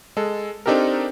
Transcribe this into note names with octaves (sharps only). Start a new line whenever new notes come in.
G#3 A4
C4 D4 D#4 G4 A4 A#4